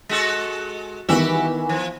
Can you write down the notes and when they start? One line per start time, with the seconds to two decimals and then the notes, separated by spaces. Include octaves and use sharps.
0.09 G#3 F#4 A4
1.09 D#3 E3 B3 F#4 G4 E5
1.69 F3